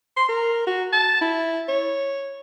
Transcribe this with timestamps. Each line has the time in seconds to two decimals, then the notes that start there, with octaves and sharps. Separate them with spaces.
0.17 C6
0.29 A#4
0.67 F#4
0.93 A5
1.21 E4
1.68 C#5